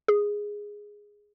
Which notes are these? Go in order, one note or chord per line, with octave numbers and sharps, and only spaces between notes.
G#4